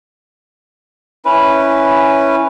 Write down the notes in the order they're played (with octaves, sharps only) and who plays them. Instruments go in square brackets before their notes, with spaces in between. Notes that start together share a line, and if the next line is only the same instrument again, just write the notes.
[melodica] C#4 E4 B4